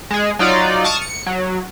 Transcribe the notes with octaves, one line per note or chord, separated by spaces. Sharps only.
G#3 G#4
F#3 D#4 F4 D5
A5 C#6 D#6 F6
C#7
F#3